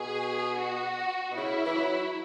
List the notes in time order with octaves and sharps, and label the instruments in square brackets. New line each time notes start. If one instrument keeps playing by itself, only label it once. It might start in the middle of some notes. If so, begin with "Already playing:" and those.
Already playing: [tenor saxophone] B2 [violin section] G#4
[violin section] F#4
[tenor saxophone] B2
[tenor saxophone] C#3 [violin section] E4
[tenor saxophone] E3
F#3